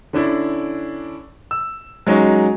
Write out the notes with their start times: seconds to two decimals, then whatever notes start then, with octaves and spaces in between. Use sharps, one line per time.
0.13 D3 C#4 D4 E4
1.51 E6
2.07 F#3 G#3 C#4 D#4